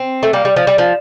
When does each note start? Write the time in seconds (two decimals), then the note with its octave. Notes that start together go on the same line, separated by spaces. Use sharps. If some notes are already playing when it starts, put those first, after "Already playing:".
Already playing: C4
0.23 A3
0.33 G3 A#3
0.45 G3
0.56 F3
0.67 G3
0.78 F3